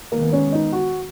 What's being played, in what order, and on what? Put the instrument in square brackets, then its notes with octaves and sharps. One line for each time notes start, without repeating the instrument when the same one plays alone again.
[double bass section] D#3 G#3 B3 [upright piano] A#3
[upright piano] C#4
D#4
F#4